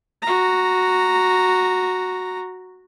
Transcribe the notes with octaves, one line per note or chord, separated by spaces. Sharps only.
F#4 A#5